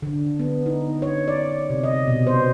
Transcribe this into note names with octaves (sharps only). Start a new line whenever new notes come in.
D3
B3
D#4
C#5
D5
C3
D#5
B2
C5